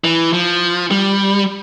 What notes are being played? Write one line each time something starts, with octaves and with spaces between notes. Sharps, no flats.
E3
F3
G3